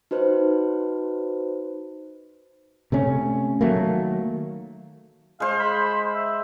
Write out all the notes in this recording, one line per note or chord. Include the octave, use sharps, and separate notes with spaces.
D#4 F#4 B4 C5
C3 A3 C#4
D#3 F#3 A3 A#3
G#3 C5 F5
B5
E5